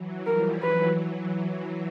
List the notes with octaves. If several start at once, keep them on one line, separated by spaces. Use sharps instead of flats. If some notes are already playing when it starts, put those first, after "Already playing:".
Already playing: E3 F#3
F3 G3 A#4
E3 F#3 B4